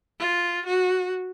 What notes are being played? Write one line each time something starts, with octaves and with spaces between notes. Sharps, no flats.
F4
F#4